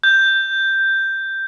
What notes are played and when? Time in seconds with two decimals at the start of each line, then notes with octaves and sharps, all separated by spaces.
0.04 G6